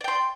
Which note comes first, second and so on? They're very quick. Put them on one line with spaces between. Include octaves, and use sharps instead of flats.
D5 G5 C6